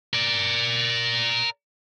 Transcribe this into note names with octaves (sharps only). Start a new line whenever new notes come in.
A#4 D5